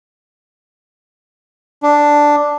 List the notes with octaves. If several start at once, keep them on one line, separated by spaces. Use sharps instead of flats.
D4